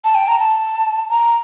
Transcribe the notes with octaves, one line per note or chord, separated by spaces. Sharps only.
A5
G5
A#5
A5
A#5